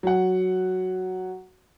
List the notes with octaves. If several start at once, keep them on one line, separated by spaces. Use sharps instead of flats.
F#3 F#5